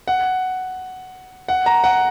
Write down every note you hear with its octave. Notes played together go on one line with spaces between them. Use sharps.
F#5
F#5
A#5
F#5